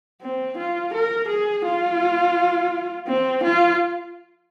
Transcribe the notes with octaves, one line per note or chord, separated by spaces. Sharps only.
C4
F4
A#4
G#4
F4
C4
F4